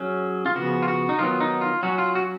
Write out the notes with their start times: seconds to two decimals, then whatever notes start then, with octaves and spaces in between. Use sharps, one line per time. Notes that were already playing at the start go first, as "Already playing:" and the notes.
Already playing: F#3 C#4 G#4
0.46 F4
0.55 C#3 F3 B3 F#4
0.82 F4
0.88 F#4
1.09 D#4
1.19 D#3 F#3 B3 F4
1.40 D#4
1.61 F4
1.83 F#3 C#4 F#4
1.98 F4
2.15 F#4